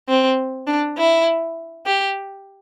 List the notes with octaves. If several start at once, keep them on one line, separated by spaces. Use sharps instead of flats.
C4
D4
E4
G4